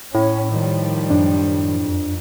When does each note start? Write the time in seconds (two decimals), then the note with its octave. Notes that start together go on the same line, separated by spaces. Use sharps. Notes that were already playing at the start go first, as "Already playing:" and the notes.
0.15 A2 C#4
0.50 D#3 F3 G3
1.10 F#2 D4
1.80 F2